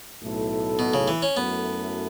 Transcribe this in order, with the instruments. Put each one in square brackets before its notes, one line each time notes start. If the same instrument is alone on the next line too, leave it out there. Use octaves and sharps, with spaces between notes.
[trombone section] B1 A2 A3 E4 A4
[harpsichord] B2
C#3
E3
C#4
[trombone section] F#2 F#3 A3 E4 A4 [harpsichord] B3